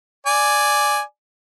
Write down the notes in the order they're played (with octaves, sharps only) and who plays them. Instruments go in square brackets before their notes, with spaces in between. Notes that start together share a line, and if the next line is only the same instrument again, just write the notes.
[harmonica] D5 G#5